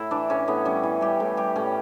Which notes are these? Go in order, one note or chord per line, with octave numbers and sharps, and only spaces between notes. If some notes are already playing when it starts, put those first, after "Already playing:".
Already playing: A2 E4
E3 D4
A2 C#4
A2 B3
G3 C#4
E3
G3 G4
A2
G3 G4
A2 C#4